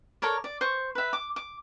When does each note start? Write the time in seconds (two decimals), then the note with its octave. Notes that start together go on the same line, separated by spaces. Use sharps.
0.22 A4 A#4 C#5 D5
0.44 D5
0.61 C5 C#6
0.95 B4 E5
1.13 D6
1.36 D6